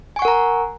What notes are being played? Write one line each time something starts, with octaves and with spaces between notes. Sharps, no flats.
A#4 F#5 G#5 A#5 C#6